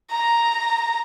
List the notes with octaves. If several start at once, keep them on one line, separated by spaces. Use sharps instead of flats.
A#5